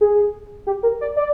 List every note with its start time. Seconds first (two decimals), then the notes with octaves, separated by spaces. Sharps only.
0.01 G#4
0.67 G4
0.83 A#4
1.01 D5
1.16 D5